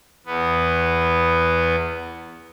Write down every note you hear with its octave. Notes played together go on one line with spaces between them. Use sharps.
E2 B3